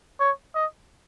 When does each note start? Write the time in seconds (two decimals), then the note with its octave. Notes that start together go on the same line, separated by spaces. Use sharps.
0.20 C#5
0.55 D#5